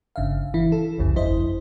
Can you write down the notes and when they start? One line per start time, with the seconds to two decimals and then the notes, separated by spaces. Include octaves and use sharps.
0.16 G1 C#3 E5 F5
0.54 E3 E4
0.72 A4
0.98 G1 C2 F2 C#3
1.15 G1 F2 E4 C5 D#5